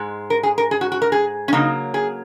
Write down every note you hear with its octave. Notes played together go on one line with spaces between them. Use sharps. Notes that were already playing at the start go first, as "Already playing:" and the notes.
Already playing: G#2 G#3
A#4
G#4
A#4
G#4
F#4
F#4
A#4
G#4
C#4
C#3 F#3 A#3 D#4
G#4